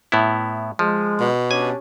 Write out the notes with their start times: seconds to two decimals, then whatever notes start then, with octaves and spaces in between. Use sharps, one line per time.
0.12 A2 B3 E4
0.79 F3 G#3
1.20 B2
1.51 C#4 D4 G4 G#5